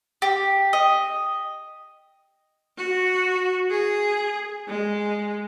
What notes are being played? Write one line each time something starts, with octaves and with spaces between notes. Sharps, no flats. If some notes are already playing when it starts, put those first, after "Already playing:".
G4
D#5
F#4
G#4
G#3